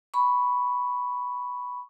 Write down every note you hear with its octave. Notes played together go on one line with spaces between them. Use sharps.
B5 C#6